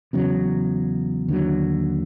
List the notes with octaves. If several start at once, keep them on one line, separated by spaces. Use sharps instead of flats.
E2 C#3 F#3
D#2 D3 F#3